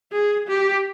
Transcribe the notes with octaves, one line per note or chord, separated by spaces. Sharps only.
G#4
G4